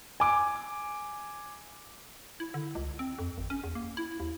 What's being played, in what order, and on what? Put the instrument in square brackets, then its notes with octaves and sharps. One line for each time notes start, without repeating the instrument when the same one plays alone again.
[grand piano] G#5 D6
[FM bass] E4
D3
C#2
C4
F2
G#1
C#4
E2
A#3
E4
D#2